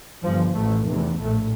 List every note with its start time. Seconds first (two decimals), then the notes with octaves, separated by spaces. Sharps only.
0.23 G1 G2 F3
0.54 A1 A2 A3
0.85 F1 E2 C3
1.17 A#1 A2 A3